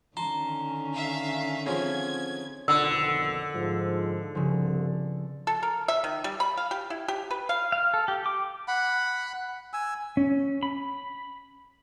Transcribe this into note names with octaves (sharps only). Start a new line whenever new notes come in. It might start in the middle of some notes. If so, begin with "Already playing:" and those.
D3 D#3 C#4 A5 A#5 C6
E5 F5
C#3 F3 C4 G#6
B1 F2 D3 D#3 B5 E6 F#6
G#2 F3
C2 G2 C#3 F3
A4
A#4
E5
D#3
G3
B5
F5
G4
E4
G4
B4
F5
F5
A4
G4
D6
F#5 B5
G#5 E6
C#4
B5